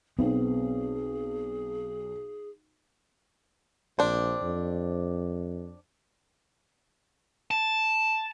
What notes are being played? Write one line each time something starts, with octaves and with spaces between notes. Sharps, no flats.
B1 B3 C4 G#4
A#1 C4 D4
F2
A5